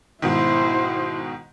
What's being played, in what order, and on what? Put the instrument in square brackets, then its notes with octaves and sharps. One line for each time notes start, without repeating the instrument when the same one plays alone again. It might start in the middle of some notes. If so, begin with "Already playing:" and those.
[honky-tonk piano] G#2 B2 D#3 [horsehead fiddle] E4 C5